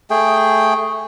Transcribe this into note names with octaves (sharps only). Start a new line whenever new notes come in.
A3 G#4 G5